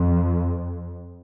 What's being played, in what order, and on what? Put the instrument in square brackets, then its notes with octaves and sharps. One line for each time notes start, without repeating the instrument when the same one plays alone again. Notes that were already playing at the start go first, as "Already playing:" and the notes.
Already playing: [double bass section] F2